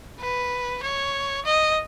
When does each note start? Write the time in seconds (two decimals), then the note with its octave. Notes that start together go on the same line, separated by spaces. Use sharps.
0.20 B4
0.83 C#5
1.45 D#5